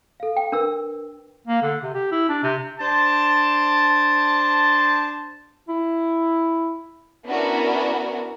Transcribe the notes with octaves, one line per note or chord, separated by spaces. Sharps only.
A4 F5
G5
D4 A#4 B4 E6
A#3
D3
C3
G4
E4
D4
C3
D4 C5 A5
E4
B3 C#4 D4 E4 F#4 A#4